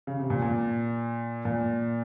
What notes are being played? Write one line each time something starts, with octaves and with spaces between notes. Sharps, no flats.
C#3
C3
A#2
A#2
A#2